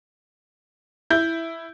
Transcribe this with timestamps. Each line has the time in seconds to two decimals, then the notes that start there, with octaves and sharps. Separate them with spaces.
1.10 E4 G6